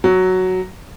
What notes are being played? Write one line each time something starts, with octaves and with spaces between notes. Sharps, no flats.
F#3